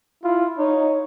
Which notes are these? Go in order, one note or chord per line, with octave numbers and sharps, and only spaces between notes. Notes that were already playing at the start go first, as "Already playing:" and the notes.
E4 F4
D#4 C#5